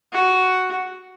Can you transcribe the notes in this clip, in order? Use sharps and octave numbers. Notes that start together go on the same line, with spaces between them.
F#4